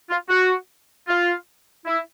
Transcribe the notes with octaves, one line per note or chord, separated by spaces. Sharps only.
F4
F#4
F4
E4